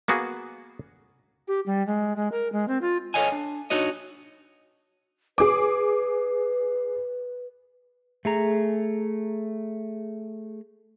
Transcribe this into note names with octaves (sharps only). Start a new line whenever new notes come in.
A#3 B3 F#4 G#4
G4
G3
G#3
G#3
A#4
G#3
C4
F4
A4 B4 C#5 D#5 F5 G#5
D4
D4 D#4 F#4 C#5 D#5
G#4 B4 D6
A3 G#4 A#5